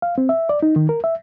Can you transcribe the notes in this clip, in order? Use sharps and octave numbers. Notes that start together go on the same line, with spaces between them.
F5
C4
E5
D5
D#4
D#3
A#4
E5